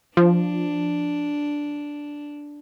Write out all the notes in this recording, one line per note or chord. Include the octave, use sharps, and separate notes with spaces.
F3 D4